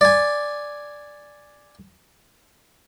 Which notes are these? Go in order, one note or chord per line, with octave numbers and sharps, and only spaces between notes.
D5 G#5